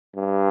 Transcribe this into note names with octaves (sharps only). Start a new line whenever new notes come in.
G2